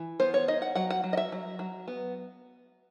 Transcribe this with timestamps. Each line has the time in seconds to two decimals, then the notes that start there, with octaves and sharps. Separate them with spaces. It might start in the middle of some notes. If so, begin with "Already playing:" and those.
Already playing: E3
0.20 B3 C5
0.34 C#5
0.48 D#4 D#5
0.62 F#5
0.75 F#3 F#5
0.90 F#5
1.04 F#3
1.13 D#5
1.17 E5
1.32 F#3
1.59 F#3
1.88 B3